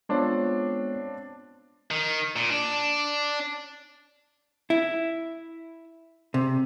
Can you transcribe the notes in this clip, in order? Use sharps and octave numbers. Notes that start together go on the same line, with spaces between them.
G#3 B3 C4 D4 F4 C#5
D#3
A#2
D4
E4
C3